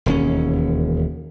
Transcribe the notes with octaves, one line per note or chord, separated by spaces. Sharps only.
E1 D#2 C#4